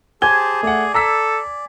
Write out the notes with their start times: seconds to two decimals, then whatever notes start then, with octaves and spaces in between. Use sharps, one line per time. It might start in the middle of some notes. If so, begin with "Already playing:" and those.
0.22 G4 G#4 C5 G#5 A5 G7
0.63 A3 D5 F#5
0.94 A4 A#5 E6 B6